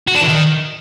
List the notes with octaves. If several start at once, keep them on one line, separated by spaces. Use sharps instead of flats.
F#4
D4
E3
D#3